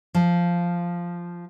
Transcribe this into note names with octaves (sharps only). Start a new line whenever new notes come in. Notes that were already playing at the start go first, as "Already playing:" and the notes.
F3